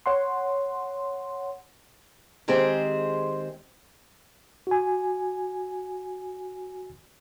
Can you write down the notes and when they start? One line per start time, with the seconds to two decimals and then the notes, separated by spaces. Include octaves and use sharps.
0.06 C#5 F#5 C6
2.48 D#3 G#3 C4 G4 G#4 C5
4.67 F#4 G#5